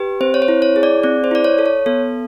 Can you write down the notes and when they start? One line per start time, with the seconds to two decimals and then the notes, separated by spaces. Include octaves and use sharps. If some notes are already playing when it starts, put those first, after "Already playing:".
Already playing: G4 B4
0.21 C4 C5
0.34 C#5
0.42 C5
0.48 E4
0.62 C#5
0.76 G#4
0.83 D5
1.03 C4 D5
1.24 C5
1.31 E4 D5
1.44 C#5
1.59 A4
1.66 C#5
1.86 B3 A4